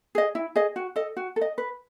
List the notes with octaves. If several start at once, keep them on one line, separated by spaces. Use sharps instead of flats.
G#4 D#5
E4
G#4 D#5
F#4
A4 D#5
F#4
A4
D#5
B4